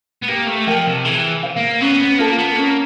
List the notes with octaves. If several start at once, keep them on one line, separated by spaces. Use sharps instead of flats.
B3
A#3 G4
A3
F3 A#4 D#5 G5
C3
E3 G#4
C5 F5
A#3
B3 C#4
B3
A#3 F4 A4
B3
A#3 C#4